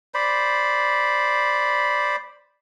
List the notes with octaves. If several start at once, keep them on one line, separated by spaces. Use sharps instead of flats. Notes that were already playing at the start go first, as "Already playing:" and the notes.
C5 D5 B5